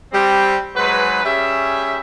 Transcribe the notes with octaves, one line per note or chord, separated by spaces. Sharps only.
G3 C4
G#2 F#3 G#3 B4
G3 C#4 G#4 E5